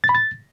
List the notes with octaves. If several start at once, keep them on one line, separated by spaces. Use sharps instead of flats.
A6
B5
A6